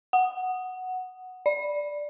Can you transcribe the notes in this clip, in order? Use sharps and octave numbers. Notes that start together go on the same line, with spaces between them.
F#5
D5